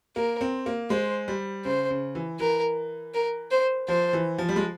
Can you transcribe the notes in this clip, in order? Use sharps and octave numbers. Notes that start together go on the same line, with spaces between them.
A#3 A#4
C4
A#3
G#3 C5
G3
C#3 C5
C#3
E3
E3 A#4
A#4
C5
F3 C5
E3
F3
G3
G#3